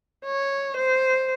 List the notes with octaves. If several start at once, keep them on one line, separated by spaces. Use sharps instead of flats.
C#5
C5